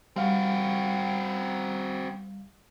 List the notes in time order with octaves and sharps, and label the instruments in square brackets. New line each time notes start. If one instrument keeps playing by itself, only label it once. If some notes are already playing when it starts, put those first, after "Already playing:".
[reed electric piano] G3 F5 [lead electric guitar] C4 F#4